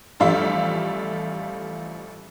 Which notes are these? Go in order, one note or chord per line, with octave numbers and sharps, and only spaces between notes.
A1 F3 G3 A3 E5 F5